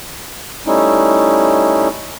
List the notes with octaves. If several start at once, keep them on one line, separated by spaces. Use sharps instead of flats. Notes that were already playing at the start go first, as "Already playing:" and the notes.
G3 A3 C#4 D#4 E4